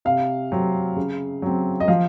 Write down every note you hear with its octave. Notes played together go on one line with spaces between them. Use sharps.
C3 F5
F#3 C4
C#3
F#3 C4
D#5
F3 F5